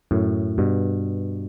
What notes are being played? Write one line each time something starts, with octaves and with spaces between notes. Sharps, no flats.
F#2 A2
G2 B2